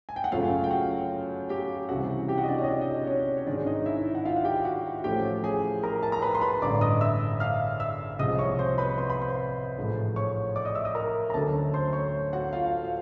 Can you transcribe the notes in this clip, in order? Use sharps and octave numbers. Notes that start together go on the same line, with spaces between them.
G#5
G5
F#5
F#2 C#3 F#3 A3 F4 F5
G5
F#4 F#5
G4 G5
C#2 C3 E3 G3 F#4 F#5
G4 G5
F#4 F#5
D#5
D4 D5
C#4 C#5
D#5
D4 D5
D#5
D5
C#4 C#5
C#5
G#2 D#3 G#3 C#4 D4 D5
D#4 D#5
E4 E5
F#5
F4 F5
F#5
G4 G5
F#4 F#5
A1 A2 F3 A3 C#4 G4 G5
G#4 G#5
A#4 A#5
A5
A#5
B4 B5
C6
B4 B5
A1 G2 D3 D5 D6
D#5 D#6
E5 E6
F5 F6
E5 E6
C2 C3 F3 G#3 D#5 D#6
C#5 C#6
C5 C6
B4 B5
C6
B5
C5 C6
A1 G#2 F3 A3
C#5 C#6
D5 D6
D#5 D#6
E5 E6
D#5 D#6
A#4 A#5
A#5
D2 D3 F#3 A3 C#4 A4 A5
C5 C6
C#5 C#6
F#4 F#5
F4 F5
F5